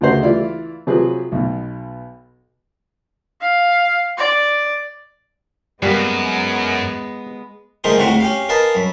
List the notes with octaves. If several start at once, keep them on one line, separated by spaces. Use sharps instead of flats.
D2 C#3 F#4 C5 E5
E3 E4 F4 D5
C3 F3 F#3 G#4 B4
B1 B2
F5
D5
F#2 G3 G#3 A#3 B3
D3 G#3 A3 D#4 A#4 C5
D2 A2 C4 F#4 F#5 A#5
C#4 G4 F5
A#4 B4 D#5 F5 G#5 A5
F#2 B5